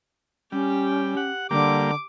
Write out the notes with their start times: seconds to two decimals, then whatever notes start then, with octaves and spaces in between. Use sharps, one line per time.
0.52 G3 C#4 G4
1.17 F#5
1.51 D3 G3 A#3 D6